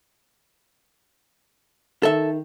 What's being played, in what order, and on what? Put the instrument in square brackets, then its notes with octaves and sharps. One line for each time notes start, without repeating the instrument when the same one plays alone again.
[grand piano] D#3 [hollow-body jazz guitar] A4 E5